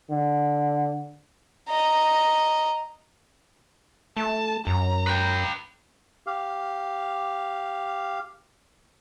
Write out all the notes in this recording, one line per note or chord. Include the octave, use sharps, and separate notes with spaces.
D3
D#5 A#5
A3 A5
F#2 A#5
B4 G5
G4 F5